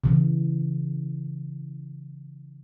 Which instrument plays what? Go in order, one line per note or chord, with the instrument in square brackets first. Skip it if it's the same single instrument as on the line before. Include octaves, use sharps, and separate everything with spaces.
[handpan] C#3 E3